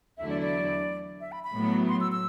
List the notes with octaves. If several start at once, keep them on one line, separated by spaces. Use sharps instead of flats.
E2 D3 F#3 A3 E4 E5
D5
D5
E5
B5
B5
A2 F#3 B3
C6
E6
E6